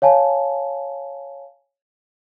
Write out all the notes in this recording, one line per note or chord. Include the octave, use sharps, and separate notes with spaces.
C#5 F5 G#5 A5